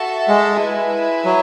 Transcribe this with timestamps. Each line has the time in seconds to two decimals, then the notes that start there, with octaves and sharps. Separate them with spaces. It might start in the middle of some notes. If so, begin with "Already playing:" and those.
Already playing: F#4 A4 E5 A5
0.28 G#3
0.60 E4 B4 E5 G#5
1.25 F#3